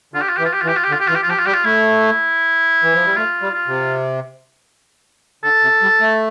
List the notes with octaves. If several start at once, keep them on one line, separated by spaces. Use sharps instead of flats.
D3 F4
G4
F4
E3 G4
F4
G4
F4
E3
G4
F4
G4
D3
F4
G4
E3 F4
G4
F4
F3
G4
F4
G3 G4
F4
A3 E4
E3
F3
G3
A3 F4
G3
F4
C3
D3 A4
C3
G3
A3